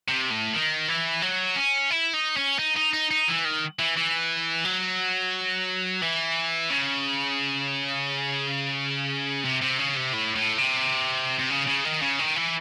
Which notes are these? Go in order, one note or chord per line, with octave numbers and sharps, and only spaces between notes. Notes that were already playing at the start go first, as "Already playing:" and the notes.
C3
A2
D#3
E3
F#3
C#4
E4
D#4
C#4
D#4
D#4
D#4
D#4
E3
D#3
E3
E3
F#3
E3
C#3
C3
C3
C#3
C3
A2
A2
C3
C3
C#3
C#3
D#3
C#3
D#3
E3